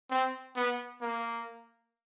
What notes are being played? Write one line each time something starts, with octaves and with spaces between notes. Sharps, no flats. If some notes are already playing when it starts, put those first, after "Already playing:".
C4
B3
A#3